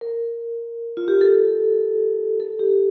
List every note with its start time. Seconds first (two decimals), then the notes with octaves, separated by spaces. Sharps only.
0.01 A#4
0.97 F4
1.08 G4
1.21 A4
2.40 A4
2.59 G4